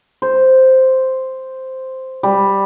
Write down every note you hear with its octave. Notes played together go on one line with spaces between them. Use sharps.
C5
G3